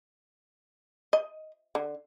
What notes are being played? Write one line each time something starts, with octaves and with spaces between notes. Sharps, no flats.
D#5
D3